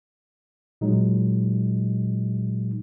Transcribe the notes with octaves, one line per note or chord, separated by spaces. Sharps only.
A#2 F#3 G#3 D#4